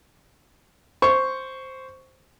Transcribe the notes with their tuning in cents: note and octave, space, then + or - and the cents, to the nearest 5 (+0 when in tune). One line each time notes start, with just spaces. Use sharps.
C5 +0 C#6 +5